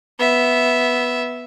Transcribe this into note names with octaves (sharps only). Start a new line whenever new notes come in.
B3 E5